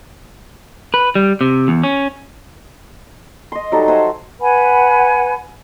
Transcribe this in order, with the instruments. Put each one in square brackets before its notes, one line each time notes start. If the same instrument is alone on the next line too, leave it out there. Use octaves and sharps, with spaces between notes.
[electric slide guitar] B4
G3
C3
E2
C#4
[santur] D#5 C6
F#3 G3 D#4 A4
C5 E5 F#5 G#5
[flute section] B4 F#5 G#5 B5